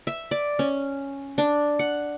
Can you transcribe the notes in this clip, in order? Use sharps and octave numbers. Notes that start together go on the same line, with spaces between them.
E5
D5
C#4
D4
F#5